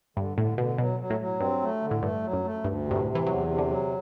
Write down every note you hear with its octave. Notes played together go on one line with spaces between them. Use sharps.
G2 D3
A2 D3
B2 D3
B2 F#3
F#3
A2
F#3
G2 C4
A3
D3
A2
G2 A3
F#3
F#2
A3
D2 G2
C3
G2
A2
C3
E3
E2 F#3
C3
D3
F#3